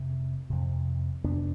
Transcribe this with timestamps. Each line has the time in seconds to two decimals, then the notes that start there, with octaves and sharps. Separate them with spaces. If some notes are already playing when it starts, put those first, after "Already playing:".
Already playing: F2 C3
0.50 F2 C3
1.24 F2 C3 B3 D4